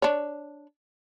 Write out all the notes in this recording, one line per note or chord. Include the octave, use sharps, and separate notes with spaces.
D4 C#5